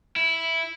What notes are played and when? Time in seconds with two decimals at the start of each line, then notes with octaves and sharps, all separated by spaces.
0.16 E4